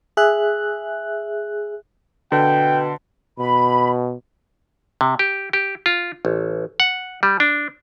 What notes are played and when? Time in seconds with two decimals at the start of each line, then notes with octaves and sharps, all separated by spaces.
0.17 G#4 E5 F#6
2.32 B2 D3 G5
3.38 B2 B5
5.01 C3
5.19 G4
5.53 G4
5.86 F4
6.25 A1
6.80 F#5
7.23 G3
7.40 D4